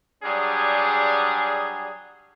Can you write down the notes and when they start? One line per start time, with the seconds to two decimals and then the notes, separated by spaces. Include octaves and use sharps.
0.24 F#3 G3 D4 G#4